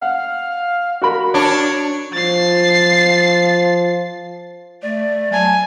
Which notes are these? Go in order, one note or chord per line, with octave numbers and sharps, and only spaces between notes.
F5 F#5
F#4 A#4 B5
D4 C#5
F3 A6 C7
A3 D5
F#3 G#5 A5